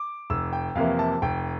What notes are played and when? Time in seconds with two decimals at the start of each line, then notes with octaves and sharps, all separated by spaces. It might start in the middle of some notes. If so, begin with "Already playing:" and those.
Already playing: D6
0.30 F1 E6
0.53 G5
0.75 F2 C3 E3 A#3 F5
0.99 A5
1.22 F1 G5